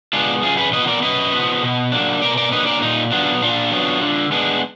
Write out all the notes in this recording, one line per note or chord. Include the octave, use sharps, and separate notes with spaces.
G#3 B3 D4 F4
F#2 F4 G#4
G#4 B4
F3 B3 B4 D#5
A#4 D5
F#2 B4 D#5
F3 B3
B2
F#3 A#3 D4
B2 A#4 D5
A#4 D5
F#3 A#3 D4 B4 D#5
A#4 D5
A#2 D#4
F#3 B3 D4 F4
A#2 D4 F4
F#3 B3
D3
G#3 B3 D4